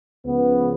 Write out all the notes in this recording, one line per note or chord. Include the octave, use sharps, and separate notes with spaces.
C#2 C#3 F3 B3